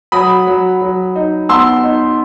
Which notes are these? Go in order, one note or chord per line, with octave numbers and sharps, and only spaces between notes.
F#3 B5 D#6
F#3
F#3
D#4
B3 C6 E6
D#4